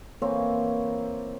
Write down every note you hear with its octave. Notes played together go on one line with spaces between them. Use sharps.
E3 A#3 C4 C#5